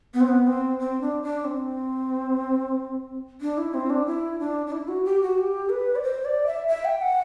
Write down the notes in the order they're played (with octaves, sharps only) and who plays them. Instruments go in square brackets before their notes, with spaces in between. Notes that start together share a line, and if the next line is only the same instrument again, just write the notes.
[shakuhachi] B3
C4
B3
C4
C4
D4
D4
C4
D4
E4
C4
D4
E4
D4
D4
E4
F#4
G4
F#4
G4
B4
D5
C5
D5
E5
E5
G5
F#5